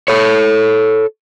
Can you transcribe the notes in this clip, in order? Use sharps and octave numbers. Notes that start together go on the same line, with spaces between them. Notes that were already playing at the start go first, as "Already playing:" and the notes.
A4 C#5